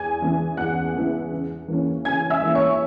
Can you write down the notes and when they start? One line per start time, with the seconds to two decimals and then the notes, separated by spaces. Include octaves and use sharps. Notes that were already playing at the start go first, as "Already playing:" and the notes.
Already playing: E2 G#5 G#6
0.22 C#3 E3 B3 E4
0.57 E2 F#5 F#6
0.95 C#3 E3 B3 E4
1.32 C#3
1.68 E3 A#3 C#4
2.05 C#3 G#5 G#6
2.30 E5 E6
2.42 E3 A#3 C#4
2.55 C#5 C#6